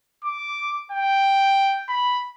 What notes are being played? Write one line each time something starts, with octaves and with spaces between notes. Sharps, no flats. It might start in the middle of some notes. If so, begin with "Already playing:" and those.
D6
G5
B5